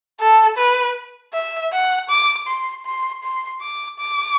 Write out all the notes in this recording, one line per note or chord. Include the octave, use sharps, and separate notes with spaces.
A4
B4
E5
F#5
D6
C6
C6
C6
D6
D6